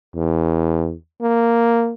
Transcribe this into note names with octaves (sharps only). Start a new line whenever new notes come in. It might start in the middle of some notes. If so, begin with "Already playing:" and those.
E2
A#3